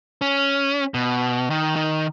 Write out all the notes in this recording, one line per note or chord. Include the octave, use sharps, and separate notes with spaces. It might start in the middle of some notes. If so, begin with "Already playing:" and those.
C#4
B2
D#3
D#3